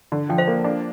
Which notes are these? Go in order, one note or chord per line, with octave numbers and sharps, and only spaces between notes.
D3
F3 G5
C5 F5
A#3
D4